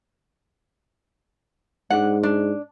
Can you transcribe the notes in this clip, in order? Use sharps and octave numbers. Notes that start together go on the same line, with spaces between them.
G#2 D4 F#5
D4